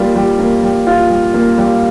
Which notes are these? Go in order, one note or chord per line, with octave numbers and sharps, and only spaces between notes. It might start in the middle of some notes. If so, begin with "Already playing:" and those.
Already playing: G3 A#3 F4
G3
A#3
G3
F4
G3
A#3
G3